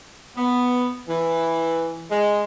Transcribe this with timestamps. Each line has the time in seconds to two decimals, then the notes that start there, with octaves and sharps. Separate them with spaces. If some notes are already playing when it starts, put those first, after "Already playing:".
0.36 B3
1.08 E3
2.11 G#3